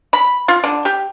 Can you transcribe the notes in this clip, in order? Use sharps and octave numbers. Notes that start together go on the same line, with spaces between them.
B5
F4
D3
G4